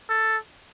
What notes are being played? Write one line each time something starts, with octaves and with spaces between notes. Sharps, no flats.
A4